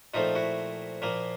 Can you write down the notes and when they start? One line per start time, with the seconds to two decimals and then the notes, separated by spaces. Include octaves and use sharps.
0.14 A#2 F3 A3 C4 D#4 F4
0.35 E4 F#4
1.02 A#2 F3 A#3